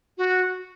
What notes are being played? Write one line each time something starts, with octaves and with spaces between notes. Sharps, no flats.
F#4